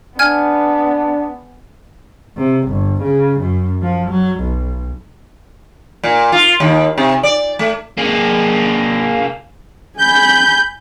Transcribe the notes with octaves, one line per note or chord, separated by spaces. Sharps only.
B3 D4 G#5 F6 G#6
C3
G1
C#3
F#2
F3
F#3
B1
A#2
F4
D#2
C3
D5
A3
A#3 G#4
G#5 B5 G6